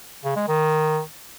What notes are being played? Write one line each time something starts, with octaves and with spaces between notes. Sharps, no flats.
C#3
G#3
D#3